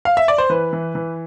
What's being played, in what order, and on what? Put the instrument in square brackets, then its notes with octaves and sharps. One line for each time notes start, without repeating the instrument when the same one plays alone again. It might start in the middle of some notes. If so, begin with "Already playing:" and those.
[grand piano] F5
E5
D5
C5
E3 B4
E3
E3